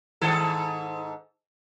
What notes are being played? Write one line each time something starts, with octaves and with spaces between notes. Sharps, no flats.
G#2 D#3 A4